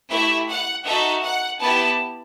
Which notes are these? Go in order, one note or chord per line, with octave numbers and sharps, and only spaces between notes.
A3 E4 G4 E5
F#5
D#4 F#4 A4 E5
F#5
B3 E4 G4 A5